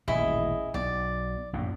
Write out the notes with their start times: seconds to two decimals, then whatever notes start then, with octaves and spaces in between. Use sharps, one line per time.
0.08 D#1 A1 B2 E4 G#4 D#5
0.74 B1 D5
1.53 A#1 F#2 A2